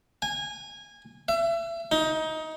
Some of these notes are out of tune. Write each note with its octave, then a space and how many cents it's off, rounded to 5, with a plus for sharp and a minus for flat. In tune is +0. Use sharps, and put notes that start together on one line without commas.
G#5 -20
E5 +30
D#4 +20